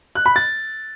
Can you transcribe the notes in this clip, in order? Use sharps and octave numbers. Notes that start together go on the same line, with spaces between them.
F#6
B5
A6